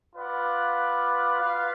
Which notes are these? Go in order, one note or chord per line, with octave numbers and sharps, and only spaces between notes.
F4 B4 D5 F#5
F4 B4 F5